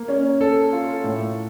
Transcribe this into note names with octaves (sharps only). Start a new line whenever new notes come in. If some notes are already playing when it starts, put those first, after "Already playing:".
Already playing: A#3
C#4
A4
F4
A2